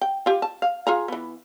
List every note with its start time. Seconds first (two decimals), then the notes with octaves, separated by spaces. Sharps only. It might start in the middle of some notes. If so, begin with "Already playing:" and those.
0.01 G5
0.26 F4 G4
0.42 A5
0.62 F5
0.87 F4 G#4 A#5
1.08 E3 B3